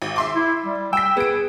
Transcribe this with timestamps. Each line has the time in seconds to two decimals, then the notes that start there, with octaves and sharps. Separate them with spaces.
0.02 G#1
0.16 E5 C6 D6
0.36 E4
0.65 G3
0.93 G5 E6 B6
1.17 B3 G#4 D7